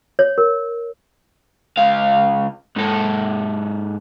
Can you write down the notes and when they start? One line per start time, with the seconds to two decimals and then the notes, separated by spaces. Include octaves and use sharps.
0.19 C#5
0.38 A#4
1.77 C#2 F5
2.77 G#2 A4